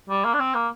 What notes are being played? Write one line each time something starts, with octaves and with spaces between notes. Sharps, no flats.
G3
A#3
D4
C4
A#3